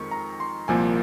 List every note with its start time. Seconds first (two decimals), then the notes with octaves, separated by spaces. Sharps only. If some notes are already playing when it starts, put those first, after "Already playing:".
Already playing: F2 D#3 G#3 C4 C#6
0.11 A#5
0.40 C6
0.68 C2 A#2 F3 A#3 G#5